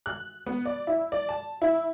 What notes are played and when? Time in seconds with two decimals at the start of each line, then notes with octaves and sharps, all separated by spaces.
0.06 F#6
0.46 B3
0.65 D5
0.87 E4
1.12 D5
1.29 A5
1.62 E4